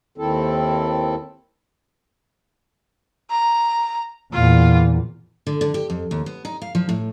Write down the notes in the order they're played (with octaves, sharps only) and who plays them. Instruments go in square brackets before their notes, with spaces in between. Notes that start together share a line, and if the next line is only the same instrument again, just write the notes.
[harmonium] D#2 D#3 C4 E4 A4
[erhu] A#5
[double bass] E2 A#2 [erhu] F4
[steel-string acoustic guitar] D3
D3
G4
F2
D#2
B3
D#4
F5
F3
A2